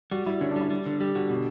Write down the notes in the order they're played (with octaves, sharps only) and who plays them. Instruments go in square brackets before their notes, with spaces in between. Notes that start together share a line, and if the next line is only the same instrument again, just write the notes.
[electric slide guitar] G3 [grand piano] F#4
[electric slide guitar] G3 [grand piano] E4
[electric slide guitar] D3 [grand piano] C#4
[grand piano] D4
[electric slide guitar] G3 [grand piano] E4
[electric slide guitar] G3
D3
[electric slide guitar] G3 [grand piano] G4
[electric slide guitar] D3 [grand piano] F#4
[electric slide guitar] B2 [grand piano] G4